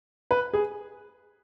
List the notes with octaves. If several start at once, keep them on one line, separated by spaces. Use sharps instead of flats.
B4
G#4